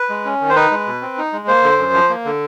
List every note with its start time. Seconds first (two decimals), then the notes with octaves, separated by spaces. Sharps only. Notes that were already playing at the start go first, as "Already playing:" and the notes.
Already playing: B4
0.09 G#3
0.25 C#4
0.41 D#3
0.50 C5
0.56 D#4 B4
0.71 G#3
0.86 B2
1.02 C4
1.18 D#4
1.33 G#3
1.48 A#3 C5
1.63 D3
1.79 F#2
1.94 F3
2.09 A#3
2.25 D3